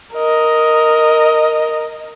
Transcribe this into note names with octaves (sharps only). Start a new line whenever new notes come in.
A#4 D#5